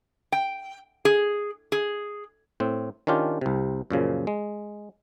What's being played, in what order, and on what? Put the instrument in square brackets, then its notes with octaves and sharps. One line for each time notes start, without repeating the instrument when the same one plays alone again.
[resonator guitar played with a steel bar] G5
G#4
G#4
[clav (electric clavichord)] A2 C4
D#3 C#4 D4 F4 G4
C2 C3
F#2 A#2 C#3 F3
G#3